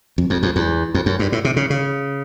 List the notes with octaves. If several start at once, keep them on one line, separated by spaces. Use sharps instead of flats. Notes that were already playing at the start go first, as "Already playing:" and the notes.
F2
F2
F2
E2
F2
F#2
G2
A2
C3
C#3
C#3